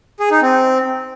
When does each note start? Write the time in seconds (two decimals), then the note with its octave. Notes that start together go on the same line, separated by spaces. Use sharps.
0.20 G#4
0.31 D#4
0.42 C4